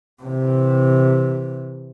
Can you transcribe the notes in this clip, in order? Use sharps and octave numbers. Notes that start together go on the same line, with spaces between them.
C3 E3